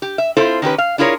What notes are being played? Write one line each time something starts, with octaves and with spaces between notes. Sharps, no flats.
G4
E5
C4 E4 F4 A4 C5
D#3 C#4 G4 B4
F5
D4 E4 F4 G#4 A#4 C#5